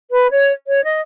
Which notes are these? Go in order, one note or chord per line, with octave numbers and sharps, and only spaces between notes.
B4
C#5
C#5
D#5